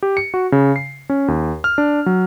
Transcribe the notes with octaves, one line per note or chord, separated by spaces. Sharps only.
G4
C#7
F#4
C#3
C7
C#4
D#2
F6
D4
F#3